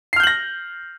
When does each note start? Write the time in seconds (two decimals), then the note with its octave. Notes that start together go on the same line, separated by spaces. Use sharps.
0.13 C7
0.16 F6
0.20 G6
0.23 F#7
0.27 A#6